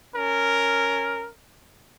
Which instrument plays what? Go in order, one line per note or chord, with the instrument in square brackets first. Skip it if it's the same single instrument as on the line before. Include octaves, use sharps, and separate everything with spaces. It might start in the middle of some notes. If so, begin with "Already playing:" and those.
[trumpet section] C#4 A#4